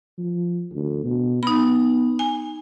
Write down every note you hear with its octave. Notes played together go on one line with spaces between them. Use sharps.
F3
D2
B2
B3 D#4 B5
G#5